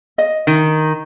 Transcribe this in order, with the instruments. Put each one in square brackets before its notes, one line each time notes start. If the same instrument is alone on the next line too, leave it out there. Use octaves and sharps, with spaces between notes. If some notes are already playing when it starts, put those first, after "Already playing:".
[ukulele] D#5
[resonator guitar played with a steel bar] D#3